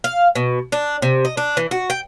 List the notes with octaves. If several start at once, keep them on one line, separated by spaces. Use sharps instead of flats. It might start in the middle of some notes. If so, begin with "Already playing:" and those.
F5
B2
D4
C3
D#5
D4
E3
F#4
G5